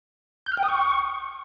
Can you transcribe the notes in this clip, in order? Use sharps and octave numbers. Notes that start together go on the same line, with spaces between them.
G6
F6
G5
D#6
C#6